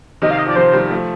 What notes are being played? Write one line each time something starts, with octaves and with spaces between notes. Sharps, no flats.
C3 D#3 D#5
F5
D#5
F3 D5
C3 D#3 C5
D#3 G3
F3 A3